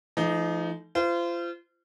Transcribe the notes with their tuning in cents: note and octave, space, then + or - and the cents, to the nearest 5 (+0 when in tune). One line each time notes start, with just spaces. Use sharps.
F3 -40 A3 -25 D#4 +0
F4 -30 C5 -25